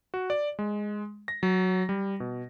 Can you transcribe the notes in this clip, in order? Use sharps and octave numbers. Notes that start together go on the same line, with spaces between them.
F#4
D5
G#3
A#6
F#3
G3
B2